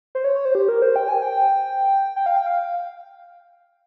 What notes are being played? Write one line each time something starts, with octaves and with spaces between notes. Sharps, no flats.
C5
C#5
C#5
C5
G4
A#4
C5
G5
G#5
G5
G5
F5
G5
F5